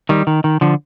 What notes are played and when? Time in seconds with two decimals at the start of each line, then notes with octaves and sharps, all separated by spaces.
0.09 D#3 G3
0.27 D#3
0.44 D#3
0.61 D3 F3